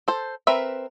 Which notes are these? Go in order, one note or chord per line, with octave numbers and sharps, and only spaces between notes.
A4 C5
C4 A#4 B4 E5